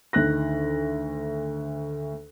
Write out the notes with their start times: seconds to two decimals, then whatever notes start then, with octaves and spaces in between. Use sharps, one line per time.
0.13 D2 D#3 F#6 A#6